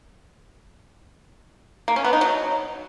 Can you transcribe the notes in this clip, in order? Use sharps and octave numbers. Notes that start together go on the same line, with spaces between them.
A#3
C#4
B3
D#4
F#3